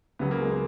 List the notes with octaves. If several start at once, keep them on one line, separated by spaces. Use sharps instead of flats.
C#2 C#3 F#3 B3
A#3
G#3
A#3